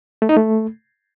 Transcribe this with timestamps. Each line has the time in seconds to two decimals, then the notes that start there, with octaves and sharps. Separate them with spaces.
0.22 A3
0.29 D#4
0.36 A3